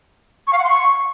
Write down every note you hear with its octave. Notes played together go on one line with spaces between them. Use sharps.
C#6
F5
F#5
C6
C#6